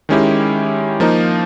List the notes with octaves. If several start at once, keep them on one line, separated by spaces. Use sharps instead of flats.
D#3 G#3 C#4 E4 G4
F3 A#3 D#4